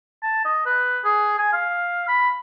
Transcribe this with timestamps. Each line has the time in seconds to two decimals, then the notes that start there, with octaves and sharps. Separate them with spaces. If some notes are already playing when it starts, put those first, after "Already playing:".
0.23 A5
0.45 D#5
0.66 B4
1.04 G#4
1.39 G#5
1.53 F5
2.08 B5